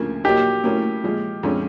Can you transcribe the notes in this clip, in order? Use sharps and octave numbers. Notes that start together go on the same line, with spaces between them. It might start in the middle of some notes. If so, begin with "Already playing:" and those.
Already playing: D2 C#3 F3 A#3
A#2 F#3 A#3 D#4 G4
A2 F#3 A#3 C#4 E4
A#2 F3 G#3
F2 D3 F3 G#3 C#4